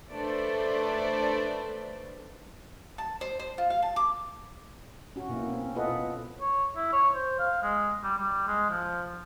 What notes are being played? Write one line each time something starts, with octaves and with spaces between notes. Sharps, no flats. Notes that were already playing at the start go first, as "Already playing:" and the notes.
A3 D4 A4 B4 C5 D5
A5
C5
C5
F4
F5
A5
D6
C#4 F#4
B2 A#3 E4
C4 C#4
E4 F4 A4 B4 D#5 F#5
B2
C#5
E4
C#5
C5
F5
G#3
G3
G3
G#3
F3